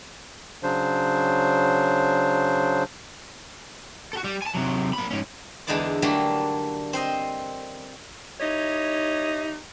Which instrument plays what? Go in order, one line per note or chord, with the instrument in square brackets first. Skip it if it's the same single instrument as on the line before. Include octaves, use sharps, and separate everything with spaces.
[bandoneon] C#3 F#3 D4 C5
[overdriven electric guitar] F#4 A4
G3
G#5 A5
C3 F#3
A#3 B5
G#2 C#4
[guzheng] E2 D3 G#3 D#4 E4 D5
D3 F#3 G3 A3 A#3
C4 C5 D#5
[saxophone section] D#4 E4 G4 C#5 D#5